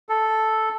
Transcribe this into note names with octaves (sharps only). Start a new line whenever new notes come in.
A4